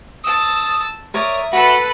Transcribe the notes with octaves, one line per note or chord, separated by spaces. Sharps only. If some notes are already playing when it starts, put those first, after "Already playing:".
A5 D#6 E6
A#4 C#5 D5 E5 D#6
F#4 A4 B4 B5